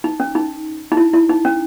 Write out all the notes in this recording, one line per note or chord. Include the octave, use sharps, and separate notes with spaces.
D#4
C#4
D#4
D#4
E4
E4
D#4
C#4